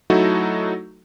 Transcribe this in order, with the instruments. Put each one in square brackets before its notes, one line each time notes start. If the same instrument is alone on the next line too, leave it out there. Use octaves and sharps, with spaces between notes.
[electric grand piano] F#3 A3 D#4 E4 F#4 A4